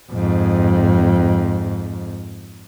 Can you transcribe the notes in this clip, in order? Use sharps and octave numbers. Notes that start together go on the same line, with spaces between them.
F2 G#2